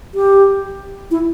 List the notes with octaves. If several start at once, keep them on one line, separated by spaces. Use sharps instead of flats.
G4
E4